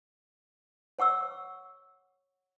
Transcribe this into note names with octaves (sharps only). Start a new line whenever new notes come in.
C#5 F#5 C#6 E6